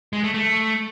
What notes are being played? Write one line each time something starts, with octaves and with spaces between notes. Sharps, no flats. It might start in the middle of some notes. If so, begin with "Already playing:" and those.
G#3
A3
A3